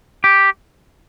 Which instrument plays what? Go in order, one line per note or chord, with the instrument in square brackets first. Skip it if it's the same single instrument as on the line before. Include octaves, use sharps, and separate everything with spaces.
[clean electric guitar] G4